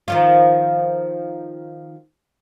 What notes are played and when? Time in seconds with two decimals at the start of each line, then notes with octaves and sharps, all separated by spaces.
0.08 D#3 F3 F4